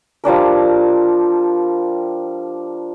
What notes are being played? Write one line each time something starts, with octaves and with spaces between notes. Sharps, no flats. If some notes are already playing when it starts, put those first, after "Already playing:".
F3 G3 D4 A#4